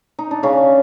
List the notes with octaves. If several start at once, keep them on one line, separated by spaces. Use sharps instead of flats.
D#4
D4
C#3 C#4